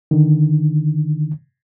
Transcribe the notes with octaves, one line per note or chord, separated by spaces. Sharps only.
D3 D#3